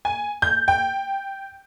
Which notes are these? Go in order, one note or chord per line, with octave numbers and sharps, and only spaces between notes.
G#5
G6
G5